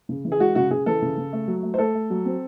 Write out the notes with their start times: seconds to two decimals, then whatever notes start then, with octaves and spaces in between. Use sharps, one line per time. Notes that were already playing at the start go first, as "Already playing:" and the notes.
0.09 C#3
0.25 E3
0.32 G#4
0.39 G#3 F#4
0.55 C#3 F#4
0.71 C#3 G#4
0.86 E3 A4
1.02 C#3
1.18 C#3
1.33 A3
1.48 F#3
1.63 A3
1.74 C5
1.78 A3 A4
1.95 A3
2.10 F#3
2.25 C4